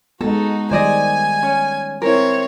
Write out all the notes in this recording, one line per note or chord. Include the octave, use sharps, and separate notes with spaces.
G#3 B3 D#4 F#4 A4
D#3 G3 C5 D5 D#5 G#5
C#4
C4 E4 A#4 C#5